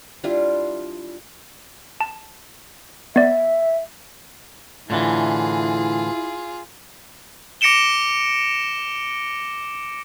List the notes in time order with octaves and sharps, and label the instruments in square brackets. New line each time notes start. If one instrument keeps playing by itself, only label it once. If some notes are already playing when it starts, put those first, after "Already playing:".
[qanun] G3 D4 E4 F4
[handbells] A5
[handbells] B3 D5 [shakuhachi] E5
[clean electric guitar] A2 D3 E3 [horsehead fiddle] E4 [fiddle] F4 G#4
[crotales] D6 A#6 C#7 D7 E7 G7